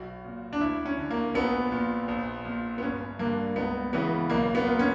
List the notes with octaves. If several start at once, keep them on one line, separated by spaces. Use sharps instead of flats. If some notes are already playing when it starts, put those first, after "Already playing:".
Already playing: B1 F#4
A#2
D4
D2 E4
C#4
D3
A#3
A#1 B3
A#2
A#1
A#2
B3
G1 C#4
G2 D3 A#3
C#2 B3
C#3 E3 B3
B1 A#3
B3
A#2
C#4